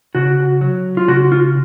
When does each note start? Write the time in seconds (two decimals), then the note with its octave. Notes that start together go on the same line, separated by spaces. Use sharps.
0.15 C#3 F#4
0.61 F#3
0.97 F4
1.08 C#3 F#4
1.32 F4